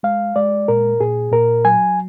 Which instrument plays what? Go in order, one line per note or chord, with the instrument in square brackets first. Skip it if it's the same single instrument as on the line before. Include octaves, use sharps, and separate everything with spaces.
[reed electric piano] G#3 F5
G#3 D5
A#2 A#4
A#2 G#4
A#2 A#4
F#3 G#5